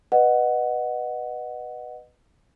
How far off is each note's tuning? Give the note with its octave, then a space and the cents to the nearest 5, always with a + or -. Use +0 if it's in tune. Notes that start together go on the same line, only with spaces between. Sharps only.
B4 +0 D#5 -20 F#5 +0